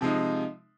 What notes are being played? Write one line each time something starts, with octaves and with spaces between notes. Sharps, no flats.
C3 F3 G#3 D#4